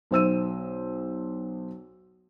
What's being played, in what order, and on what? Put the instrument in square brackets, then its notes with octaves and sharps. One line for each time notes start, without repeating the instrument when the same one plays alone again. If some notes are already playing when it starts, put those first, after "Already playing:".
[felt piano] B1 C5 E6 D#7